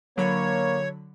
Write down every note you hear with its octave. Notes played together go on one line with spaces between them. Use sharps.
D3 F#3 A#3 C#5 B5